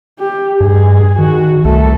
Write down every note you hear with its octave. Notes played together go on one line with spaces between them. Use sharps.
G4
G2 G#4
D#3 F#4
C2 A3 A4